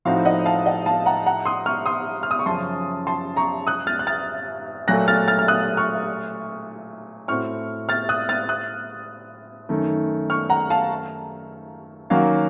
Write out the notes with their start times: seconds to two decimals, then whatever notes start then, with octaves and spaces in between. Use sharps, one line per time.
0.05 A2 F3 C4 D#4 F#4 F5
0.25 D#5 F#5
0.46 F5 A5
0.66 D#5 F#5
0.86 F5 A5
1.06 F#5 A#5
1.26 F#5 A#5
1.45 C6 D#6
1.66 C#6 F6
1.86 C6 D#6
2.23 F6
2.31 D#6
2.39 C#6
2.46 F#2 C#3 F3 A5 C6
3.07 A5 C6
3.37 A#5 C#6
3.67 D#6 F#6
3.87 F6 A6
3.99 F#6
4.07 F6 A6
4.88 A#2 F#3 A3 F#6 A#6
5.08 F6 A6
5.28 F6 A6
5.39 F6
5.48 D#6 F#6
5.77 C#6 F6
7.28 A2 A3 C4 F#4 C#6 F6
7.89 F6 A6
8.09 D#6 F#6
8.29 F6 A6
8.49 D#6 F#6
9.69 F#2 D#3 A3
10.30 C#6 F6
10.49 F#5 A#5
10.70 F5 A5
12.10 D#3 F#3 A#3 C#4 F#4 F5